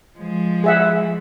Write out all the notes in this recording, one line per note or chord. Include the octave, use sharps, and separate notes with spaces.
F3 G#3
G#4 E5 F#5